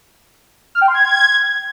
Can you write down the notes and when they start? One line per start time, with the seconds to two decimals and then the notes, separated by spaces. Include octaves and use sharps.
0.75 F6
0.81 G5
0.88 C6
0.94 G#6